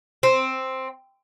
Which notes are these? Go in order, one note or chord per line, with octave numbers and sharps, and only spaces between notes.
C4